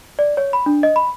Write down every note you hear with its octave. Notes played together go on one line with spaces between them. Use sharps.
D5
C#5
B5
D4
D#5
B5